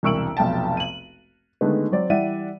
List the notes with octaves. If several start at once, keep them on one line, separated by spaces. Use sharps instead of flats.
E1 C2 C#6 E6 D7 F#7
F1 B1 G5 A5
D#7 F#7
D3 D#3 G#3 A3 B3
F#3 C4 D5
E3 G3 D5 E5 F#5 D#7